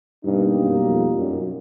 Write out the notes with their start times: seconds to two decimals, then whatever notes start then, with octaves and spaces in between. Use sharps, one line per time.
0.24 G2 B2 G3 A#3 D#4
0.55 F#2
0.86 F2
1.17 F#2